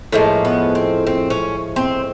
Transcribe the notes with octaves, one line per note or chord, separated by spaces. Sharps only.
A2 F3 G#3 A#3
B3
C4
C4
C#4
C4